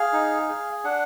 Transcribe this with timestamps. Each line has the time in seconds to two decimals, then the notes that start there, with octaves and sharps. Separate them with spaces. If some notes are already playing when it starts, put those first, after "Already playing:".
Already playing: G#4 F5
0.13 D#4
0.48 G#4
0.84 D4 F#5